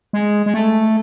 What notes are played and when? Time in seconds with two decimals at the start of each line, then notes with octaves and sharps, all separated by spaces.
0.13 G#3
0.46 G#3
0.54 A3